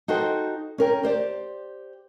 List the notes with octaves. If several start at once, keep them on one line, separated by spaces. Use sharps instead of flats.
D#4 F#4 A4 C5 G5
C#4 A#4 G5
G4 C5 D5